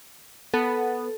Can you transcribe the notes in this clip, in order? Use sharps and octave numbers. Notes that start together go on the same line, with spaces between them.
B3 A4